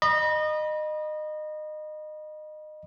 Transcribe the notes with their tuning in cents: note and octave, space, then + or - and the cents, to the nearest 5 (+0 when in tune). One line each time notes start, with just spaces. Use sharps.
D#5 -25 B5 -35